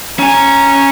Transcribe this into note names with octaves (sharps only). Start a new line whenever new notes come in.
C#4 G#5 A#5